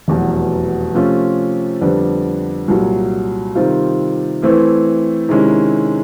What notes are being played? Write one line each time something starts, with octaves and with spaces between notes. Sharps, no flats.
F1 E2 B2 F#3
C3 F3 A3 C#4 F4
F2 D3 G3 B3 D4
C2 A#2 F#3
C3 D#3 G3 C4 F4
E3 A3 C4 E4
C3 D#3 G#3 C#4 E4